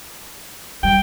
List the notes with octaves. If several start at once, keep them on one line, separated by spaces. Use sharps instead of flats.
G3 D#4 G5